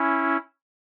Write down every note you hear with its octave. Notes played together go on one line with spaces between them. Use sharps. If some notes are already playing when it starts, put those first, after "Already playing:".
Already playing: C#4 E4